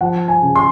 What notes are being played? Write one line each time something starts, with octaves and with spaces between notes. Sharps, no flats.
F3 F#5
G#5
C#3
C6